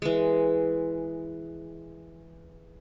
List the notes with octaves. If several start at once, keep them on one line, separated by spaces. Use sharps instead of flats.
E3 G#3